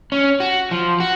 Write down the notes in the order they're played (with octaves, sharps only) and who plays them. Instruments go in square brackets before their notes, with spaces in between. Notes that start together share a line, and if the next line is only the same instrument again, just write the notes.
[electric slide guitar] C#4
F#4
F3
F#4